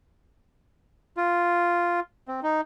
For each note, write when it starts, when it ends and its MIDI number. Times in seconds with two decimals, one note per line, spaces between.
1.17 2.00 65
2.28 2.40 60
2.43 2.61 63